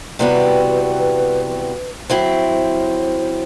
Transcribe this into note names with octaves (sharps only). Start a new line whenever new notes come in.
C3 E3 G3 B3 F#4 B4
F#3 C4 E4 C5